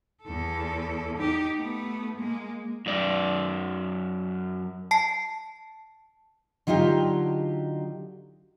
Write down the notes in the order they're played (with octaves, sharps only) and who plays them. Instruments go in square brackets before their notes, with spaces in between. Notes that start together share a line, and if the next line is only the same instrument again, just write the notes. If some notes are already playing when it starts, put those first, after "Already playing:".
[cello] E2 A4
D#4 G4
A3 B3
G#3 A#3
[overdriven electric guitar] F#2 D5
[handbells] A5 C7
[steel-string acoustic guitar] D3 F#3 D#4 F4 G4